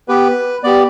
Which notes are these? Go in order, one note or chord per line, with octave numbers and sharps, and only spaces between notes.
B3 G4 B4
B3 G4 D5